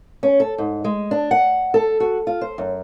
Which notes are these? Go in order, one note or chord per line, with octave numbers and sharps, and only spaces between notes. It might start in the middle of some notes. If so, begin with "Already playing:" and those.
C#4
A4
G#2
G#3
D4
F#5
A4
F#4
F4
C5
F#2